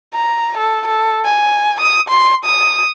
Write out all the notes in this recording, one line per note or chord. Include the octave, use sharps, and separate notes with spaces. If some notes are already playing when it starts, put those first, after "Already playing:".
A#5
A4
A4
G#5
D#6
C6
D#6